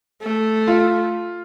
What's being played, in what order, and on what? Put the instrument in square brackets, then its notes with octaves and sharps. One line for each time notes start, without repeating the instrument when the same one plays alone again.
[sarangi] A3
[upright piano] F4